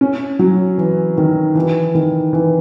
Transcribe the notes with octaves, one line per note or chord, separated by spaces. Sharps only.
C#4
F#3
E3
D#3
E3
D#3
E3